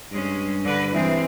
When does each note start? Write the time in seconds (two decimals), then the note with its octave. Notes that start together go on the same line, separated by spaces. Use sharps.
0.12 G2 G#3 C#4
0.64 D3 B4
0.93 E3 G#3 C4